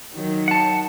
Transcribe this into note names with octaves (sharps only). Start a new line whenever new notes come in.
D#3 F#3
F#5 A5